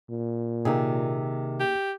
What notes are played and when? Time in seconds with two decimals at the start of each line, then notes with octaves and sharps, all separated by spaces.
0.10 A#2
0.65 C3 D#3 A#3 D#4 G#4
1.60 G4